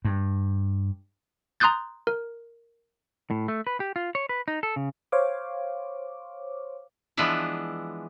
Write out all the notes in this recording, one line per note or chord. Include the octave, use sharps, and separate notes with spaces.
G2
A#5 C6 D#6 F#6 G6 A6
A#4
A2
A3
B4
G4
F4
C#5
B4
D#4
A4
C#3
C5 C#5 F5 D6
E3 F3 G#3 B3 D4 E4